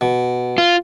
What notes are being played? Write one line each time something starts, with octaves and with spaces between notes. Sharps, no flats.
B2
F4